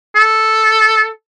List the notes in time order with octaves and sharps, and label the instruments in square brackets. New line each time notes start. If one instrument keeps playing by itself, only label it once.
[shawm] A4